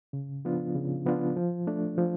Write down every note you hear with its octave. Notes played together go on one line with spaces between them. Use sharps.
C#3
F3 B3 D4 F4
C#3
F3 B3 D4 F4
F3
A3 D4
F3